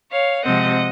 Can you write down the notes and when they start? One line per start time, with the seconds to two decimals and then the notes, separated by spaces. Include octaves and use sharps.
0.12 C#5 F5
0.45 C3 F3 G#3 C4 D#5 F#5